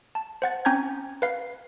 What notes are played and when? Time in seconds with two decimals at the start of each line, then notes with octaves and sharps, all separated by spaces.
0.15 A5
0.42 C5 F#5 A6
0.65 C4 C#4 G#5 A#5 G6 G#6
1.22 B4 F5